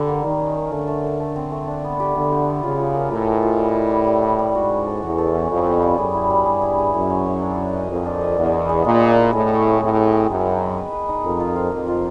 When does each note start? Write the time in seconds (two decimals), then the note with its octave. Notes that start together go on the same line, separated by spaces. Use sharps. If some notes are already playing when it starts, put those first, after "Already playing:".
Already playing: D3 G3
0.09 A#3
0.24 D#3 A#3
0.40 C#4
0.57 A#3
0.72 D3 A3
0.88 A3
1.04 A3
1.20 A3
1.36 C4
1.52 A3
1.67 D4
1.84 B3
2.00 G4
2.15 D3 B3
2.31 G4
2.47 B3
2.63 C#3 F4
2.79 F4
2.95 A#4
3.11 A2 G#3
3.27 G#3
3.43 F4
3.59 G3
3.75 E4
3.91 G3
4.07 G3
4.23 G3
4.39 G3
4.54 G#2 F#4
4.70 C#4
4.86 A4
5.02 E2 F#4
5.18 A4
5.35 C#4
5.50 F2 G3
5.66 B3
5.82 G3
5.98 F#2 G#4
6.14 E4
6.30 G3
6.46 G2 G#4
6.62 E4
6.78 G#4
6.94 F#2 E4
7.10 C#5
7.25 C#5
7.41 D4
7.58 F#4
7.73 D#5
7.89 F2 A#4
8.06 D4
8.21 D#5
8.37 E2 G#3
8.53 B3
8.69 G#3
8.84 A#2 G#3
9.01 G#3
9.16 E4
9.33 A2 G#4
9.49 C#5
9.64 C4
9.81 A2 C4
9.97 G#4
10.12 C4
10.29 F#2 B3
10.45 D#4
10.61 D#4
10.76 B4
10.93 B4
11.09 D#4
11.24 F2 A#4
11.40 F4
11.56 F4
11.72 F2 A#3
11.88 F4